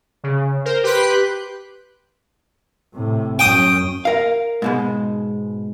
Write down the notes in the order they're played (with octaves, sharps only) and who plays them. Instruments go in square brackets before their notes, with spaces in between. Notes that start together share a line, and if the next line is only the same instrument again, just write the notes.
[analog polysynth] C#3
A#4 C5
G4 B4 B5 C6 F#6 G6
[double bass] A2 C3
[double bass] F#2 C#4 [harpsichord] G5 D#6
[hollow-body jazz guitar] A#4 F5
G#2 B2 G#3